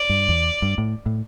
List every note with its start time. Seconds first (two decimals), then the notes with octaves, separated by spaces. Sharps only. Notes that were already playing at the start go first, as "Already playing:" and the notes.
Already playing: D5
0.10 G2
0.29 E2
0.62 G2
0.78 A2
1.06 A2